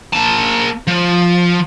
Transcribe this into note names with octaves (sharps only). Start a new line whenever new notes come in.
A#3 A5
F3